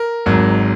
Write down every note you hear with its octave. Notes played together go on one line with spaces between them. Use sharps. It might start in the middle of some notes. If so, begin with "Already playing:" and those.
Already playing: A#4
G#1 G#2 F#3